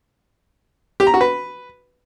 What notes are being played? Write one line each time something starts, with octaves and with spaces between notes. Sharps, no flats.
G4
A#5
F#4
B4